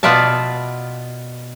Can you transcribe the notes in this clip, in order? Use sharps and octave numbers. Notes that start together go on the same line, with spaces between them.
B2 B3 F4 D5 E5 A5